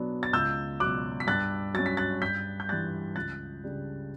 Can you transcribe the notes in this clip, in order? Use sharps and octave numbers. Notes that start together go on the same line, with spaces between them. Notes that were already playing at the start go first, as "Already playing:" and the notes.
Already playing: B2 F#3 B3 D4
A6
C#2 E6 G6
B2 F#3 D6 F#6
B6
G2 F#6 A6
F#3 C#4 A6
B6
F#6 A6
G2 G6 B6
G6
E3 G3 D4 F#6 A6
C#2 F#6 A6
C#3 G3 D4